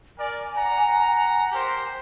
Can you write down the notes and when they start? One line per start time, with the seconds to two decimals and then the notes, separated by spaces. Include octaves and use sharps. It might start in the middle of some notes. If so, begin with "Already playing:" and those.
0.18 A#4 D5 G#5
0.55 F#5 A#5
1.52 G4 A#4 C5